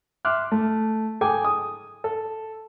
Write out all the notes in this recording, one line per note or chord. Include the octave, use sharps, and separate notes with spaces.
E5 C6 D6 F6 F#6
A3
G#4 A4 G5 G#5 D6
D#6
A4